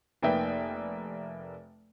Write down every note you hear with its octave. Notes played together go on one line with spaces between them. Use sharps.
F1 A#3 D#4 B4 E5 G5